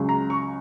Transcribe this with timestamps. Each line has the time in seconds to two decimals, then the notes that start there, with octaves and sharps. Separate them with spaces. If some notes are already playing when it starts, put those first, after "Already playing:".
Already playing: C#2 C#3 F#3
0.09 A#5
0.30 C#6